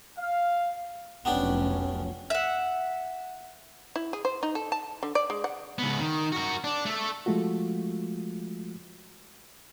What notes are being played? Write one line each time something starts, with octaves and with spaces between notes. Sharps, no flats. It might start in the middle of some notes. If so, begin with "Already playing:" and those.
F5
F1 B1 B3 C#4 D4 G4
E5 F#5
E4
G#4
C5
D#4
A4
A5
D3
D5
G#3
F#5
C#2 B3
D#3
F#4 A#4
D4
A3 A4
F3 G#3 A3 F4 F#4